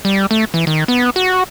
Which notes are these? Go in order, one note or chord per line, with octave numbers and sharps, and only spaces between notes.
G3
A3
E3
D#3
B3
F#4